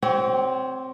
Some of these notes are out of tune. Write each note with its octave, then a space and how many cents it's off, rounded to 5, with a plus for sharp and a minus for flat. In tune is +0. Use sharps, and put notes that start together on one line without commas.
C4 +0 F#4 +45 C#5 +15